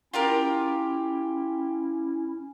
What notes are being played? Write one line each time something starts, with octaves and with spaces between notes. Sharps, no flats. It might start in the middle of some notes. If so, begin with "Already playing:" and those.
C#4 E4 F4 G4 A#4